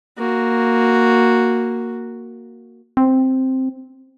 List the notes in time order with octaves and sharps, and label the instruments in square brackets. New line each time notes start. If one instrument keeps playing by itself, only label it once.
[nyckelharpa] A#3 F#4
[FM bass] C4